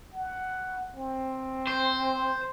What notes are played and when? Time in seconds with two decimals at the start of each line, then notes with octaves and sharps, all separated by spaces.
0.13 F#5
0.95 C4
1.67 C5